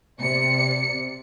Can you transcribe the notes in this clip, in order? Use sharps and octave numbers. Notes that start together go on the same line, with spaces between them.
C3 D5 C#7